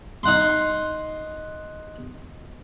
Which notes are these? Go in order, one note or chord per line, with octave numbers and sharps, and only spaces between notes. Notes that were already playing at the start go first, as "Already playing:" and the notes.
D#4 F#5 C6